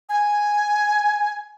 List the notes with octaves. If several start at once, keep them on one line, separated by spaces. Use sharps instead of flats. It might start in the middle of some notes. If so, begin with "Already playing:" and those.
G#5